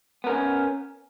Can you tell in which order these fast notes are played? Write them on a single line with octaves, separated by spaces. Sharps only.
B3 A#4 C#4